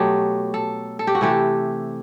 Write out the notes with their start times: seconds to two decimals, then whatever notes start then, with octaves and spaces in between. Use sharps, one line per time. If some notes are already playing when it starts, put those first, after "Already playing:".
Already playing: B2 F#3 A3 G4
0.54 A4
0.99 A4
1.07 G4
1.15 F#4
1.21 C3 E3 A3 G4